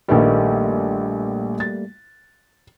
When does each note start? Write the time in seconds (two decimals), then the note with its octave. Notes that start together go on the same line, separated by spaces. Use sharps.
0.08 A#1 D#3 G3 A3 A#3 B4
1.60 A6